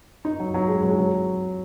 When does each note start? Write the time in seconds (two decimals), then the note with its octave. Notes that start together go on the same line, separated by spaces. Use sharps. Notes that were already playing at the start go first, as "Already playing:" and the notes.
0.25 D#4
0.40 F#3
0.54 F#3
0.68 G#3
0.83 F#3
0.90 G#3
0.99 F#3